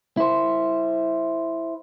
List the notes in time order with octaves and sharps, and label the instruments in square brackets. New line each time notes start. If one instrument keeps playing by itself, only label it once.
[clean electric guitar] E4 C5